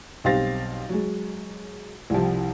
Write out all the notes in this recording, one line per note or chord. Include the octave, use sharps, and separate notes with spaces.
B1 G3 C4 F5 A6 A#6
F#3 G#3
C2 C3 F3